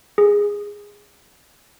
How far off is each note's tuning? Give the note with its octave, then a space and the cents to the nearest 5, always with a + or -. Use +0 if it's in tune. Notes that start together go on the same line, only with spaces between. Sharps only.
G#4 -15